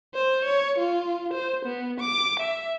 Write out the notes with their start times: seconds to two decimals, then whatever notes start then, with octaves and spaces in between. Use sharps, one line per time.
0.14 C5
0.44 C#5
0.79 F4
1.33 C5
1.65 B3
2.00 D6
2.40 E5